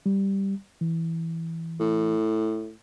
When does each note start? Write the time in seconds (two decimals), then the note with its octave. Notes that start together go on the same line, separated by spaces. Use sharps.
0.06 G3
0.81 E3
1.80 A2